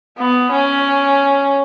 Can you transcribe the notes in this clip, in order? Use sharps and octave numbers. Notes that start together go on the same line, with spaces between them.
B3
C#4